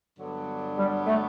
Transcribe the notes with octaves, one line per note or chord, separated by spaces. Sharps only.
G2 D3 F#3 B3 D4
G3
A3